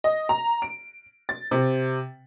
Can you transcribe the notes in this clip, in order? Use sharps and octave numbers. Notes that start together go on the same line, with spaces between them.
D#5
A#5
D7
A6
C3